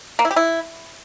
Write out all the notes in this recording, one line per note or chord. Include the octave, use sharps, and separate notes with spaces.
A#3
E4
G4
E4